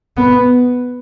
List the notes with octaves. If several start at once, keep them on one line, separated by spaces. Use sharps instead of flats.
B3